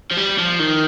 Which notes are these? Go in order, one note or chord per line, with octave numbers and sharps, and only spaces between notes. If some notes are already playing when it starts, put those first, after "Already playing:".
F3
G3
F3
D#3